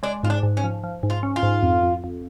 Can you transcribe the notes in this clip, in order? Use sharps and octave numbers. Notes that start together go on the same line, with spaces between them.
G#3 D4
G#2 F4
D4
G#2
C#4
F3
F3
G#2
F4
C#4
F4
G#2
F2
F2
F2